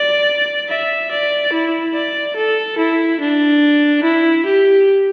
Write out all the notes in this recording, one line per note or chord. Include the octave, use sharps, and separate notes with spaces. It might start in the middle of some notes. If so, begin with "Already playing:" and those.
Already playing: D5
E5
D5
E4
D5
A4
E4
D4
E4
G4